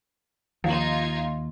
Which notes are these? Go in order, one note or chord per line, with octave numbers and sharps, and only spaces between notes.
D#2 F3 D#4 F4 G#6